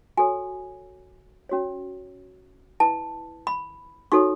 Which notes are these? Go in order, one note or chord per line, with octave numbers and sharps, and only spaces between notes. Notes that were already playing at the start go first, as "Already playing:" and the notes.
F#4 A4 C#5 G#5
C#4 F#4 C#5
E4 B4 A5
B5
D#4 F#4 A4 C#5 C#6